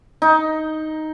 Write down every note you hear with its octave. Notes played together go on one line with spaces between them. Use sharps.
D#4